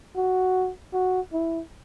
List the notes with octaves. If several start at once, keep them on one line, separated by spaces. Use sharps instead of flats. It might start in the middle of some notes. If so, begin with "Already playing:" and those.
F#4
F#4
E4